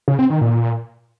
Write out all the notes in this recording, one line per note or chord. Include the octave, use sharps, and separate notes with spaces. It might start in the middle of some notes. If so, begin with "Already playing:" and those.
C#3
C4
D#3
A#2